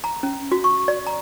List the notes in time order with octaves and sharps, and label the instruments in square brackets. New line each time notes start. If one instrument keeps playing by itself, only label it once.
[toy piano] A#5
C#4
F#4
C#6
D5
A#5